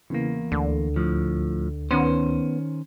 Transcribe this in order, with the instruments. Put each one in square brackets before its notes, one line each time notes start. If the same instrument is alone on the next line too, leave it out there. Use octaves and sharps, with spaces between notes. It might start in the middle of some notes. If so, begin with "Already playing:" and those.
[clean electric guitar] E2 A#3 [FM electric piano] C#3 E3
[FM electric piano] D2 [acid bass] D3
[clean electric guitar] A2 F3
[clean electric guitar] D#3 C#4 C5 [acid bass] B3